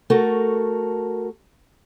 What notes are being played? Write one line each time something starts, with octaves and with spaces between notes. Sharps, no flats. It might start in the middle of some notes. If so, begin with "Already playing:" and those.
A3 F#4 A4 A#4